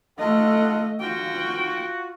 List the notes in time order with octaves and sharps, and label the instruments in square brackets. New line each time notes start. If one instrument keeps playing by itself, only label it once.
[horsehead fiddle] A3 D#5 [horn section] F4 A4 F#5
[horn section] F4 F#4 [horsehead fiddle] G5